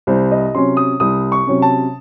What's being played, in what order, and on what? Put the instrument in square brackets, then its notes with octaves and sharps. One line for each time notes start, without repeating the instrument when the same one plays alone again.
[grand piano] C2 C5
D#5
C3 F#3 C#4 C6
D#6
C2 D#6
C#6
C3 F#3 C#4
A5